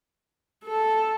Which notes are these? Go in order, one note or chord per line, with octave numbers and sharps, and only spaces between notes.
A4